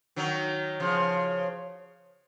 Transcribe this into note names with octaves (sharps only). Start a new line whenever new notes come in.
D#3 F#3
C#3 F3